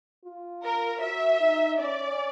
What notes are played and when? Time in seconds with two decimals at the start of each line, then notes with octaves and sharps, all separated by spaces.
0.25 F4
0.64 A#4
1.01 F#4 E5
1.40 D#4
1.79 C#4 D5